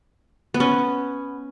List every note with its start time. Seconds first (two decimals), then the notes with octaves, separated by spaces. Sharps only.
0.54 B3
0.60 C#4